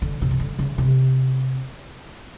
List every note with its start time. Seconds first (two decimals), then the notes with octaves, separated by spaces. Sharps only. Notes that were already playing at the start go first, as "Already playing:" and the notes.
0.02 D3
0.22 C3
0.31 C#3
0.40 D3
0.59 C#3
0.78 C3